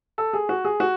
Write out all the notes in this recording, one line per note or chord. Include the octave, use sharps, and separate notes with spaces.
A4
G#4
F#4
G#4
F#4